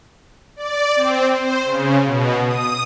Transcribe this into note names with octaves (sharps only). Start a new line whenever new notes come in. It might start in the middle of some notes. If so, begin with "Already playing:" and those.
D5
C4
C5
C#3
B2
D#6